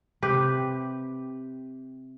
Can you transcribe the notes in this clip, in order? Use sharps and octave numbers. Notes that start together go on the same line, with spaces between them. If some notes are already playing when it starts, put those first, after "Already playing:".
C3 G4 B4